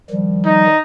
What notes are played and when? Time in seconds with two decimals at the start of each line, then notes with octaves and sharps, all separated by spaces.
0.10 D#3 F3 G3
0.45 D#4